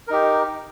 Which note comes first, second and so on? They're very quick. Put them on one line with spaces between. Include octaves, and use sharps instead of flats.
A#4 D#4 G4